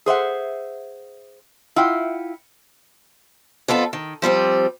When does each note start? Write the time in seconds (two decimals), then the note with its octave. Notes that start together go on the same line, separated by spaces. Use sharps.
0.06 G#4 C5 E5 F#5
1.76 E4 F4 F#5 G5
3.68 F2 B3 F4 A4
3.93 D#3
4.22 F3 G3 B3 C4